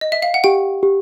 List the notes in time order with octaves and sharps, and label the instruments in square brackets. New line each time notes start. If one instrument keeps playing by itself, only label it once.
[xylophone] D#5
E5
F5
F#5
[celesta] G4 [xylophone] G5
[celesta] G4